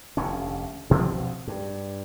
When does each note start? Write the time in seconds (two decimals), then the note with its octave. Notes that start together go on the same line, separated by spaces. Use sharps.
0.17 F1 D#2 D3 C#4
0.90 D2 B2 F3 C4
1.48 G2